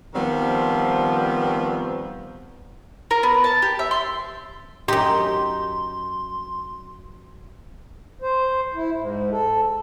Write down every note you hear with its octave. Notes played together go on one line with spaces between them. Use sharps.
D#3 F3 G3 B3 C4
A#4
B3
A5
G4
E5
C6
F#2 D#4 G4 C6
C5
E4
G#2
A4